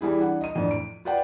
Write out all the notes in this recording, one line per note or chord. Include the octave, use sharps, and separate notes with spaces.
E3 G3 E4 G#4
D4 F#5
D#5 D#7
F2 A2 D4
D7
F4 B4 D5 F#5 G5